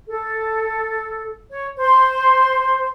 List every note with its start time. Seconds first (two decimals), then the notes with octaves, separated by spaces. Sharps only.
0.08 A4
1.50 C#5
1.77 C5